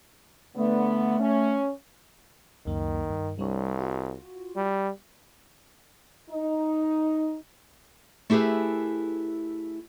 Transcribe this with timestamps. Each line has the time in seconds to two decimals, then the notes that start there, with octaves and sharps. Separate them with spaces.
0.56 D3 A3 B3
1.20 C#4
2.66 C#2 F#2 D#3 A#3
3.10 G2
3.39 C2 G3 D4 C#5
3.78 F4 F#4
4.56 G3
6.30 D#4
8.30 A3 E4 G4 G#4 B4